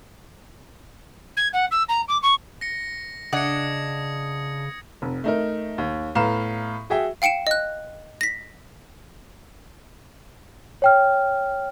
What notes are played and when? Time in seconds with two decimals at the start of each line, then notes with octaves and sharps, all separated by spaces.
1.36 G#6
1.53 F#5
1.71 E6
1.88 A#5
2.08 D6
2.22 C#6
2.61 A#6 C#7
3.33 C#3 D4 D#5 F#5 D#6 G#6 C#7
5.02 F1
5.24 A3 D#4 A#4
5.78 D#2
6.15 A2 B3 F5 A#5 E7
6.90 F#4 G#4 E5 G5
7.22 F5 G5 C#7 D7 E7
7.47 D#5 F#6
8.21 A#6 B6
10.82 C#5 G5 F6